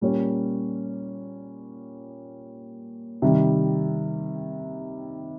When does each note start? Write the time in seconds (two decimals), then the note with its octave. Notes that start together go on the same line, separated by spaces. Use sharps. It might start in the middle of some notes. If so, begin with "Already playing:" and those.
0.01 A#2 G3 A#3 C#4
3.22 C3 D#3 G3